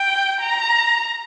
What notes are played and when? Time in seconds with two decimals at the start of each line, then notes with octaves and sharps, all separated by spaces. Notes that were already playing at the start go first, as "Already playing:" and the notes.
Already playing: G5
0.41 A#5